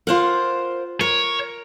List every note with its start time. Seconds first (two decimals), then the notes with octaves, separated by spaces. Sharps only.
0.07 F4 A#4 C5 F5 F#5
1.01 A#4 C#5